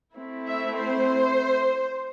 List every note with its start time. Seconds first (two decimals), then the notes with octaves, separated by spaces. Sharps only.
0.15 A3 C4 E4
0.47 E5
0.78 C5